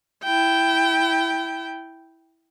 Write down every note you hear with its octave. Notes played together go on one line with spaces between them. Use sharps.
E4 G5